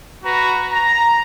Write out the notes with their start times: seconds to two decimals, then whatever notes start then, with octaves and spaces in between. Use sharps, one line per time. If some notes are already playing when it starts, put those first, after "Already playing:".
0.24 F#4 B4 A#5
0.72 A#5